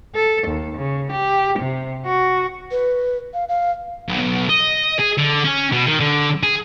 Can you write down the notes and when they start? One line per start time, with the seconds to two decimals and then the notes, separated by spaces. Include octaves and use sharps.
0.15 A4
0.47 D#2
0.77 C#3
1.12 G4
1.59 C3
2.06 F#4
2.71 B4
3.34 F5
3.49 F5
4.08 B1
4.49 D#5
5.00 G#4
5.18 D3
5.45 C#4
5.72 B2
5.86 D#3
6.00 D3
6.43 G#4